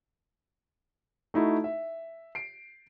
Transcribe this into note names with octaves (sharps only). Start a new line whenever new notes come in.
A3 D#4 E4 F#4
E5
C7 D7